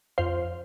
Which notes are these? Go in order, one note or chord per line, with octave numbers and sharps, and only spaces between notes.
F2 C5 F5